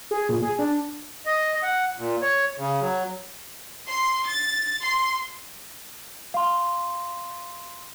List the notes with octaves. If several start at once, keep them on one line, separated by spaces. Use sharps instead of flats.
G#4
A#2
G#4
D4
D#5
F#5
A#2
C#5
C#3
F#3
C6
A6
C6
F5 C6